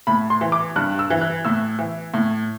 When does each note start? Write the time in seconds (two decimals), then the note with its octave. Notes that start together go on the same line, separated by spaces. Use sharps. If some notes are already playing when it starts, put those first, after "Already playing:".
0.07 A2 B5
0.30 C6
0.41 E3
0.52 D6
0.76 G2 F#6
0.99 E6
1.10 E3
1.21 F#6
1.45 A2 E6
1.79 E3
2.14 A2